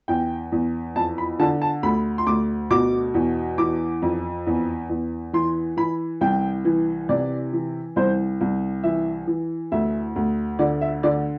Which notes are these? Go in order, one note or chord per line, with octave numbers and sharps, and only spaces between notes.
E2 G5
E2
F2 A5
B5
D3 A5
A5
D2 B5
C6
D2 D6
B2 D6
E2
E3 D6
F2
E2
E2
E3 C6
E3 B5
C2 G5
E3
C3 D5
E3
C2 C5
C2
E3 E5
E3
D2 E5
D2
D3 D5
E5
D3 D5